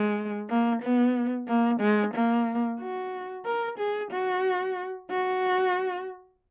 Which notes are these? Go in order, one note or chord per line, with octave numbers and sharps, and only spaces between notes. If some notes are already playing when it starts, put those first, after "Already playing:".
Already playing: G#3
A#3
B3
A#3
G#3
A#3
F#4
A#4
G#4
F#4
F#4